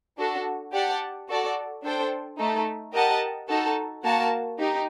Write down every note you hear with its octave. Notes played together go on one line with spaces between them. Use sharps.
D4 F#4 A4
G4 D5 F#5 A5
F#4 A4 D5
D4 A4 C5 G5
A3 D#4 A4
G4 A#4 D#5 F#5 A5
D#4 F#4 A4
A#3 F#4 A#4 F#5 A5
D#4 G4